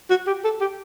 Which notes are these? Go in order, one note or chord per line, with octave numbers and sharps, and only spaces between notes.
F#4
G4
A4
G4